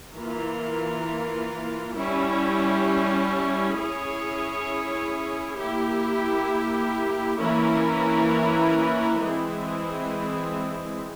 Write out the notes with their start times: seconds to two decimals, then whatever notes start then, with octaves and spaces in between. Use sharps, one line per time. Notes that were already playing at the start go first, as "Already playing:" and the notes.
0.15 E3 A#3 F4 A#4
1.96 G3 C#4 E4
3.76 C#4 E4 G#4 C#5
5.58 A#3 E4 G4
7.39 E3 A#3 C#4 E4 A#4
9.20 E3 G#3 C4 E4 G#4